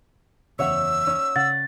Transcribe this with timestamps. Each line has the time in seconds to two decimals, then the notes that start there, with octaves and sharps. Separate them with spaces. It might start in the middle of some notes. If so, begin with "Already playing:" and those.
0.59 F#1 E2 C#3 C#5 E5 F#5 E6
1.07 C#4
1.36 C#3 F#5 A6